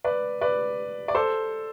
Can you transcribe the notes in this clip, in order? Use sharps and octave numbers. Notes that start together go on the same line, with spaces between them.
B4 D5
B4 D5
D5
A4 C5